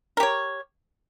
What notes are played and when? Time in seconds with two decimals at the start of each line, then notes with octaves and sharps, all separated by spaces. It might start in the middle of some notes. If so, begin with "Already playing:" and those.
0.17 A#4
0.20 G4
0.23 C#5